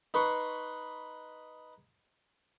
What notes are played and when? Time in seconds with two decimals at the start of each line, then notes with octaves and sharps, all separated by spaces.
0.14 D#4 B4 C6 C#6